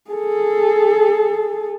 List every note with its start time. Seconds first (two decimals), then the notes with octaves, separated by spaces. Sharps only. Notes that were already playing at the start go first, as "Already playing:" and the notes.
0.11 G#4 A4